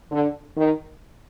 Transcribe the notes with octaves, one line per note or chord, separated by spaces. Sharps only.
D3
D#3